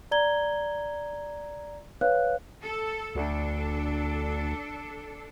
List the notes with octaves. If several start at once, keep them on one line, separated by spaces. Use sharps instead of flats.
D5 A#5 G#6 G7
B4 C#5 F5 F#6
A4
D2 D4 A4